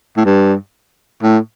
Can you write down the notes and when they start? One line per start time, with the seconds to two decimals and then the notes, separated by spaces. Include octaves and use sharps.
0.17 A2
0.25 G2
1.23 A2